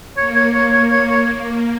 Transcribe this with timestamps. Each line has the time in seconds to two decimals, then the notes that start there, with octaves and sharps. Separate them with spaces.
0.17 A#3 C#5
0.35 C#5
0.54 C#5
0.73 C#5
0.92 C#5
1.09 C#5